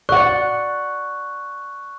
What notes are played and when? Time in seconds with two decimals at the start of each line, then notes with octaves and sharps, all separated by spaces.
0.09 D5 F#5 C#6 F#6